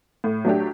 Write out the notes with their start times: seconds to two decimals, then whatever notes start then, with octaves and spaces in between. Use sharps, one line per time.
0.24 A2
0.45 F#3 A3 D4 G4